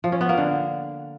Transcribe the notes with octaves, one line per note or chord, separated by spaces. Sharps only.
F3
C#4
B3
A#3
D3